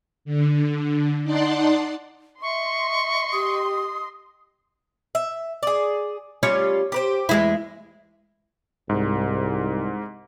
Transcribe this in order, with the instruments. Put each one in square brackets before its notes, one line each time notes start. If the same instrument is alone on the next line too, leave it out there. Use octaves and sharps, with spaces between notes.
[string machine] D3
D#4 D5 F#5 A5 C6
[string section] D#5 C6 [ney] E5 [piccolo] C#6
[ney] G4 [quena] D#6
[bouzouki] E5
G#4 D5
[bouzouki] G3 C#4 F4 [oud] C#5
[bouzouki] G4 B4 C5
[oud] E2 G#3 E4
[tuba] C2 [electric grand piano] G#2